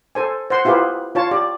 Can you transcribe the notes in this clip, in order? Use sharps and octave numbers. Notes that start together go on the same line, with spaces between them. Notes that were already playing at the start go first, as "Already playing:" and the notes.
A4 C5 G#5
C5 F#5 C6
E4 F4 G4 G#4 B4 C5
F4 C#5 A5
G4 D5